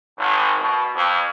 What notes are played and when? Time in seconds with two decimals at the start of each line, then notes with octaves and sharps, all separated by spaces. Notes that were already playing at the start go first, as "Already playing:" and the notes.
0.19 G#1
0.60 B2
0.96 F2